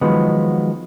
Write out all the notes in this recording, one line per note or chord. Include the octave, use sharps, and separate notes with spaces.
D#3 F3 F#3 G#3 B3